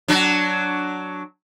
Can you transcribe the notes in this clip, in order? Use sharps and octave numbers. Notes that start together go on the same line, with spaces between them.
F#3 D4